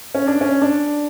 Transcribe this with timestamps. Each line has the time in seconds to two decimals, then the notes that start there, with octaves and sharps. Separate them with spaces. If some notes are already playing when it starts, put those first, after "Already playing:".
0.14 C#4
0.27 D4
0.41 C#4
0.62 D4